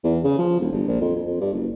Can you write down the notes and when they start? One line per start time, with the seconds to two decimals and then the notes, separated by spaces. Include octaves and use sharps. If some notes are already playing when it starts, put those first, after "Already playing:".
0.04 E2
0.24 C#3
0.38 F3
0.60 E1
0.72 G1
0.88 A#1
1.01 F2
1.15 F2
1.26 F2
1.41 G2
1.53 F#1